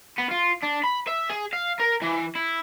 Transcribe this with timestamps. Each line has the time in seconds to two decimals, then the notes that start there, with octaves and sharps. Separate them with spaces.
0.18 B3
0.31 F4
0.63 D4
0.84 B5
1.07 E5
1.29 G#4
1.53 F5
1.80 A#4
2.02 E3
2.35 E4